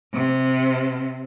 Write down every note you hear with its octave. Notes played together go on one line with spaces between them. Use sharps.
C3